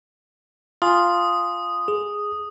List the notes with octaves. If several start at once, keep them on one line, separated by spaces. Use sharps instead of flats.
F4 G#5 A#5 C6 D#6
G#4